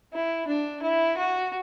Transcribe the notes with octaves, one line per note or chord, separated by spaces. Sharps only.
E4
D4
E4
F#4